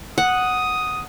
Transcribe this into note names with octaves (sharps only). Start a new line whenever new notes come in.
F#5 D#6